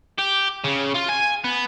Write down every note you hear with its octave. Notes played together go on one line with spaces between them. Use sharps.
G4
C#3
F4
G#5
B3